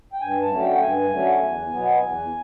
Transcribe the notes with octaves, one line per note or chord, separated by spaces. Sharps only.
G5
G2 G#5
A5
D3 F#3 A3 C#4
G5
G2 G#5
D3 F#3 A3 C#4
E2
B2 F#3 B3
E2